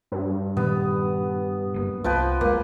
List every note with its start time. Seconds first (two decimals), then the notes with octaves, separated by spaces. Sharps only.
0.12 G2
0.57 A#2 D#3 G3 B3
1.74 F#1 C3 A#3
2.04 C2 F3 B4 G5
2.41 E1 G#3 A#3